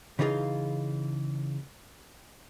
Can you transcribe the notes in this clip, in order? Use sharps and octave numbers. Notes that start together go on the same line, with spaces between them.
C#3 E3 D#4 F4 G#4 F5